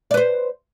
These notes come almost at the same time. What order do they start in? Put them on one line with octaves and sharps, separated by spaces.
D5 B4 C5